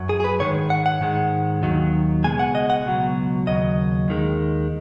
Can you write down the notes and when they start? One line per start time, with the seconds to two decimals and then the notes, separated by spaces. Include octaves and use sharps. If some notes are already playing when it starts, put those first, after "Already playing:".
Already playing: F#2 F#3
0.09 G#4
0.20 G#4
0.24 B4
0.40 G#2 D#3 G#3 C#5
0.70 F#5
0.86 F#5
1.01 G#2 D#3 G#3
1.62 D#2 D#3 F#3
2.24 C#2 B2 G#3 G#5
2.39 F#5
2.55 D#5
2.70 F#5
2.85 C#2 B2 F#3
3.47 D#2 C#3 F#3 D#5
4.08 D#2 D#3 G#3